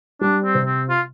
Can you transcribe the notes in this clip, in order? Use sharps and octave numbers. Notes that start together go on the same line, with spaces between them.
G3 D4
C4
C3
C4
F4